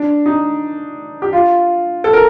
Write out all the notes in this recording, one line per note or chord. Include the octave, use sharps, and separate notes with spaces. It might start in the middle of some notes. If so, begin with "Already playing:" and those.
Already playing: D4
D#4
G4
F4
A4
A#4